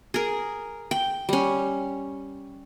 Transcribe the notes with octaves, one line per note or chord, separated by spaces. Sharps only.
G#4 A#4
G5
G3 C#4